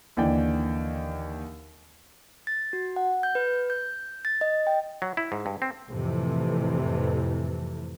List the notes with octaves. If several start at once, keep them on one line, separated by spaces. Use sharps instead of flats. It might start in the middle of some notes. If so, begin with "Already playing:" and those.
D#2 D3 E3 D5 G5
A6
F#4
F#5
G6
B4
G6
A6
D#5
G5
F#3
E4
G#2
G2
C4
F2 A2 C3 E3 A3